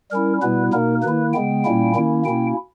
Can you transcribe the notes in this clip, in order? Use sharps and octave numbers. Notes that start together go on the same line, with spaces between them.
G3 C#4 E4 A#4
B2 G3 B3 E4 B4
B2 A#3 D#4 A#4
D#3 A#3 E4 B4
C#3 G#3 B3 G5
A#2 G3 A#3 C#4 E4
D#3 A#3 C#4 E4
B2 A#3 C#4 E4 G5